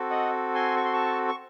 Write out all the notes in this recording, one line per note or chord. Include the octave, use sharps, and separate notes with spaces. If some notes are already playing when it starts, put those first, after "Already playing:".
Already playing: C4 F#4 A4
D#5 F#5
G#5 C6
C#6
C6
A5 C#6
C#6